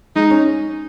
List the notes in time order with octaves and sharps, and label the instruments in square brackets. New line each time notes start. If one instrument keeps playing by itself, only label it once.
[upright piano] G#3 [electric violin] D#4
[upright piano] C#4